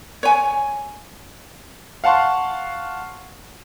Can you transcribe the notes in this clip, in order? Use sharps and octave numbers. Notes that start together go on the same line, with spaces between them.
C#5 G#5
F5 F#5 A5 C6 C#6